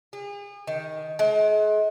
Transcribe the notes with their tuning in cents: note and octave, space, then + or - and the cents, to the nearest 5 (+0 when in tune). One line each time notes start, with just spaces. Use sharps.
G#4 -40
D#3 +10
G#3 +35